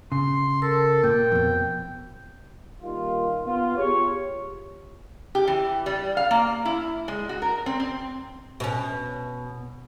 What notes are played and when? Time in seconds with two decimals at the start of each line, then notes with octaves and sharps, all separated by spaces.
0.12 C#3 C6
0.62 A4 A#4
1.04 A#2 G5
1.32 F2 B2
2.82 A#2 D#3 G3 F4
3.45 B3 F4
3.76 F4 G4 G#4 C#5
5.35 G4
5.47 E3
5.86 G3
6.17 F5
6.31 A#3
6.65 E4
7.08 G#3
7.29 F#4
7.42 A#4
7.66 C4
7.80 C4
8.60 B2 C#4